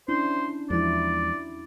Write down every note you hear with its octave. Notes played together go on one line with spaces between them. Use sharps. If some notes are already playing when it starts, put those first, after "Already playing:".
C#4 D4 E4 C5
E2 F3 G#3 E4 F#4 D5